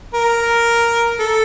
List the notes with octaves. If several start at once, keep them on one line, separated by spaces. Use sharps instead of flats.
A#4
A4